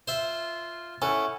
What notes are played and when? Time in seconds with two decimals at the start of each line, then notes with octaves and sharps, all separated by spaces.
0.08 F4 C5 E5
1.02 C#4 E4 A4 F#5